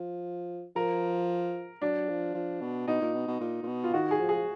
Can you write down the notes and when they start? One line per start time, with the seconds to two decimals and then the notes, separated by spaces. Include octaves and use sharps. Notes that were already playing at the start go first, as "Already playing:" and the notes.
Already playing: F3
0.75 F3 A#4
1.81 F#3 D4
2.09 F3
2.34 F3
2.61 B2
2.87 B2 D#4
3.01 A#2
3.14 B2
3.28 B2
3.40 A#2
3.63 A#2
3.67 B2
3.84 F4
3.94 D#3 F#4
4.11 G#4
4.20 F3
4.29 G#4